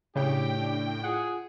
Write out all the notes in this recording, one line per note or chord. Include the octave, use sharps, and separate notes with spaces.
A2 C#3 D4 G4 G5
D4
F4 G#4 F#5